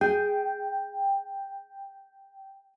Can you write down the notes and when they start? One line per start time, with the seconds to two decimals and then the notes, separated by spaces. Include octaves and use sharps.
0.01 G#4 G5